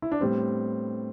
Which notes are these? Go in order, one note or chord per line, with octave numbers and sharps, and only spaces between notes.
E4
D4
A2 G3 B3 C4